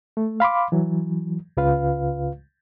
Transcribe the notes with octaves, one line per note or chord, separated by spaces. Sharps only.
A3
F5 B5 C6 D6
E3 F#3
C#2 C#3 F4 B4 F5